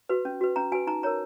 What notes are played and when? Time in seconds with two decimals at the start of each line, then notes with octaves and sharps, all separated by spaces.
0.09 F#4 B4
0.25 C#4
0.41 F#4 B4
0.56 C#4 A#5
0.72 F#4 G#5
0.75 B4
0.87 D#4 A#5
1.03 A#4 C#5 A#5